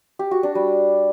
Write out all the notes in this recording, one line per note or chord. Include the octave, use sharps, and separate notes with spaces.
G4
F#4
D4
G3